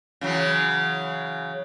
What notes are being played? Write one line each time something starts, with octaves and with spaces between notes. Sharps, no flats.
C#3 E3 F#3